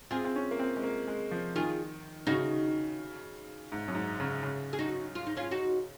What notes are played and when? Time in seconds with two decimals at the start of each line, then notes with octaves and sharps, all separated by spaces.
0.11 C4 F4 G#4
0.25 C4
0.36 C#4
0.51 A#3
0.59 C4
0.76 G#3
0.83 A#3
1.08 G#3
1.31 F3
1.56 D#3 F4 G#4
2.27 C#3 D#4 F#4
3.72 G#2
3.88 F#2
3.95 G#2
4.20 C#3
4.43 C#3
4.73 G#4
4.79 D#4 F#4
5.15 F4
5.27 D#4
5.37 C#4 F4
5.51 D#4 F#4